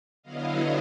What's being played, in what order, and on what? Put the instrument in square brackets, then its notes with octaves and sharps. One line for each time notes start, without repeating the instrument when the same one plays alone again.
[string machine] D3 F#3 B3 E4 D#5 F5